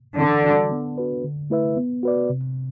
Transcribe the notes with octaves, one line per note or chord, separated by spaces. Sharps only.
D3 E3
G3 D4 F#4
B3
D4 F#4 B4
D3
A3 E4 B4 E5
B3
F#4 B4 D5
C3